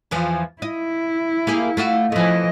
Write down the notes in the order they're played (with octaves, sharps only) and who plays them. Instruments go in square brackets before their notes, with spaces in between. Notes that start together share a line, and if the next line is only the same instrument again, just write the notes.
[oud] E2 E3 F3
[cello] E4 [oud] D#5
[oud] A#3 G4 G#4
A3 F4 F#4
[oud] E3 A3 [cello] F3 D#5